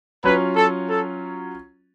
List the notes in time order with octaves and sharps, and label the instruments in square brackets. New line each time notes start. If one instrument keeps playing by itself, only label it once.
[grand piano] F#3 C#4 F4 [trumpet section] B4
[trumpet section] A4
A4